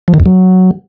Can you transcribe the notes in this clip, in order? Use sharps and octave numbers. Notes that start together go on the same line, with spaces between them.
F3
D#3
E2
F#3